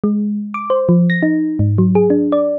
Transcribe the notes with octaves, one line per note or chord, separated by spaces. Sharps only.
G#3
D6
C5
F3
A#6
D#4
G#2
F#3
G#4
D4
D5